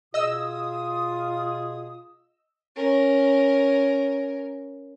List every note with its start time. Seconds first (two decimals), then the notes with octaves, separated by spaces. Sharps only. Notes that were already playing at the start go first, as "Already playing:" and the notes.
0.14 B2 F4 G#4 D#5 D#6 E6
2.76 C#4 A#4